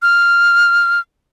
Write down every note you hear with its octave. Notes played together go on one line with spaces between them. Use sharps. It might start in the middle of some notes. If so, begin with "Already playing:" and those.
F6